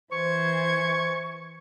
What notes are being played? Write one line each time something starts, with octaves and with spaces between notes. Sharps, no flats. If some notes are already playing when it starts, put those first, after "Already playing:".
E3 C5 C#6 G#6